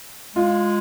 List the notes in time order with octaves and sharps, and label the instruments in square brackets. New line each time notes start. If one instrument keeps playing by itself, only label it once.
[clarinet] G#3 [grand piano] F4